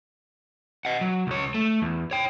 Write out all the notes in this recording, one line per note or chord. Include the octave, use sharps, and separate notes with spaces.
D#5 F#5
F#3
C#2 C#5
A3
E2
C#5 G5